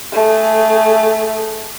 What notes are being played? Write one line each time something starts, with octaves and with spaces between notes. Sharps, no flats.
A3 G#4